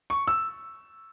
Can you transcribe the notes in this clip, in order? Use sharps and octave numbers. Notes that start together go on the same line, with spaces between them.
C#6
E6